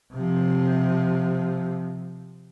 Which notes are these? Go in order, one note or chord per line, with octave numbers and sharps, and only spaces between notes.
C3 F3